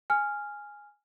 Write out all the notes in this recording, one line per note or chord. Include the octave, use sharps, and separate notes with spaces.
G#5 F6